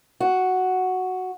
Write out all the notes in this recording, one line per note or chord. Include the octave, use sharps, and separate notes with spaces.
F#4